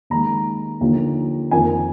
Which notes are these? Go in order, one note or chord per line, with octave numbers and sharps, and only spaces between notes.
D#2 D#3 G#3 A#5
D#2 D3 F3
F2 D#3 A#3 G#5